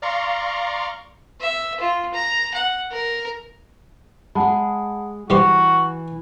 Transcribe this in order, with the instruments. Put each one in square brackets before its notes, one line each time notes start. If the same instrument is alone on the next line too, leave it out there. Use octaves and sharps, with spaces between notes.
[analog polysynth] D5 F5 A#5 C6 C#6
[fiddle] E5
F4
A#5
F#5
A#4
[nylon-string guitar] G#3 G#4 [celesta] F#5 A5 B5
[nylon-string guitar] E3 [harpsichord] G3 G4 C5 [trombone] F#4 [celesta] C#6